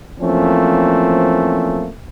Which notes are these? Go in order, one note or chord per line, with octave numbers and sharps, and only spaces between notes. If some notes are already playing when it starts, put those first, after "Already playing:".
E3 F3 A3 A#3 C4 C#4